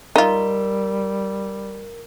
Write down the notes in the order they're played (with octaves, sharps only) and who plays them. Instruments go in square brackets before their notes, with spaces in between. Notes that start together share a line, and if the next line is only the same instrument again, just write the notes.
[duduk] G3 [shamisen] D#4 F4 [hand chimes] A#4